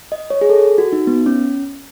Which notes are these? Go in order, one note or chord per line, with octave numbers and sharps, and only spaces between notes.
D#5
C#5
G#4
A4
F#4
D#4
B3
C#4